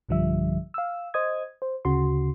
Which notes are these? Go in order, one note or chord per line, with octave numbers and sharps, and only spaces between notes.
B1 G2 D3 F3 G3 E5
F5 E6
C5 D#5 D#6 G#6
C5
D2 C#3 F#4 C6